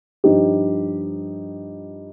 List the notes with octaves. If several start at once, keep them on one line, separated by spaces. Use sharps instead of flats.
G2 F3 D#4 G4